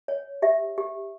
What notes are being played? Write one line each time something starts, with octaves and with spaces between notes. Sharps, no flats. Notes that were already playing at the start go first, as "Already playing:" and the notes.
C#5
G4 E5
G4